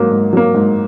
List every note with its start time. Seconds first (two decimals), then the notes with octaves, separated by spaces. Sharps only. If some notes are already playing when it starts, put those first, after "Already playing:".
Already playing: G#2 F#3 A#3
0.11 G#2
0.33 F#3 A#3
0.54 G#2